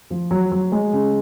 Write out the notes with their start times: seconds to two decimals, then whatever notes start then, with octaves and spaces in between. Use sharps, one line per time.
0.10 F3
0.31 F#3
0.52 F#3
0.72 G#3
0.93 C#3